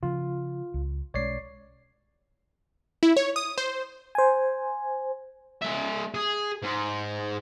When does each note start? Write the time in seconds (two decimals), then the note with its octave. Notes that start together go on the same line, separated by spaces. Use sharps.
0.03 C#3 F3 F4
0.74 C#2
1.14 B1 G#3 C#4 C#5 D5 C7
3.03 E4
3.17 C#5
3.36 D#6
3.58 C5
4.15 C5 G#5
5.62 G#3 E5
6.14 G#4
6.63 G#2